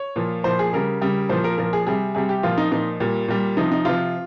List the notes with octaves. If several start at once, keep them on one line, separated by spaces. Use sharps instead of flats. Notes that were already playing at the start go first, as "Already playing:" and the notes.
Already playing: C#5
A#2 F3
A#2 F3 C5
G#4
C#3 G3 A#4
C#3 G3
A#2 F3 C5
A#4
A#2 F3 A#4
G#4
C3 G3 G#4
C3 G3 G#4
G4
A#2 F3 F4
D#4
A#2 F3 D#4
A#2 G3
A#2 G3
C3 F3 D#4
D#4
C3 F3 F4